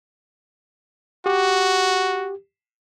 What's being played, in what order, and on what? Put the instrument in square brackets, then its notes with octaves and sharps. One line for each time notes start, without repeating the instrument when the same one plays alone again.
[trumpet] F#4 [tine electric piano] G4